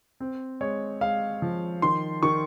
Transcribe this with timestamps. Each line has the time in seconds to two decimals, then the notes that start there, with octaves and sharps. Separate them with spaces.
0.20 C4
0.61 G#3 C#5
1.01 G#3 F5
1.42 F3
1.82 D#3 C6
2.23 D#3 C#6